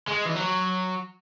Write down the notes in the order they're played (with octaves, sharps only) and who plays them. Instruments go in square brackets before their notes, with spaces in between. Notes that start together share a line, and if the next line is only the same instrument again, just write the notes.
[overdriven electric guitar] G#3
E3
F#3